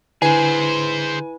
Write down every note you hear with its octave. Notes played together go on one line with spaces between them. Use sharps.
D3 E4 G#4 B4 C5 G#5